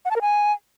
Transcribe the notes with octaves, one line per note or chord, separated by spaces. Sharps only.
F#5
A5
A#4
G#5